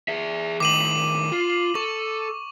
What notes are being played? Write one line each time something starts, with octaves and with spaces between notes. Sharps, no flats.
G#4 E5
A2 D#3 D6 D#7 F#7
F4
A4 C#6